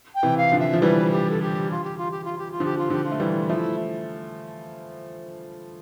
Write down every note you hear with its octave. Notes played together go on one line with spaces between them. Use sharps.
G5
C3 E3
F5
D3 F3
E5
F3
E3 G3 B4
G4
A4
G4
F4
G4
F4
G4
F4
G4
F4
D3 F3
G4
F4
D3 F3 G4
F4
A3
E3 G3
F3 A3 E4 F4